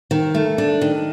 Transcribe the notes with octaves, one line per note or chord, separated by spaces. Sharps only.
D#3
A3
D4
D#3